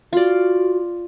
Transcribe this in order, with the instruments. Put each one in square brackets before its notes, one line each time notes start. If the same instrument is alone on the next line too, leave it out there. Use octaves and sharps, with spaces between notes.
[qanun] F4 D5 [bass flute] F#4